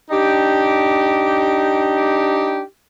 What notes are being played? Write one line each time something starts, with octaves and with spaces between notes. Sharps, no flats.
D4 D#4 G4